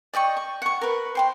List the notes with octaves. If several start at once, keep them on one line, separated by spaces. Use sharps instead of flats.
D5 D#5 G5 C#6
C#6
F#5 C#6
A#4 B4
C5 G5 C6